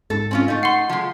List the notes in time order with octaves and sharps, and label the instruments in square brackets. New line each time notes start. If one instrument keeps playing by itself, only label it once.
[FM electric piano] G#2 [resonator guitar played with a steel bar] A4
[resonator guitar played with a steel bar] C4 C#4 F4
A3 D#4
[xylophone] F#5 C6 [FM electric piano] C7
[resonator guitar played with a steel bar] F3 G#3